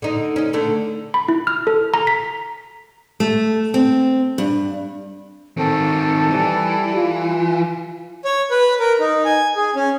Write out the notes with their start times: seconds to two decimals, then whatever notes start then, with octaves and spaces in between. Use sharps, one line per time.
0.02 D3 D#4
0.36 C#4 D#4
0.53 D3 A3
1.14 B5
1.28 E4
1.47 F6
1.67 A4
1.94 A#5
2.07 B6
3.20 A3
3.74 C4
4.38 G2
5.57 D#3 C4 A4
6.31 E3 G3
6.96 F4
8.25 C#5
8.51 B4
8.80 A#4
9.00 D#4
9.25 G#5
9.56 G#4
9.75 C#4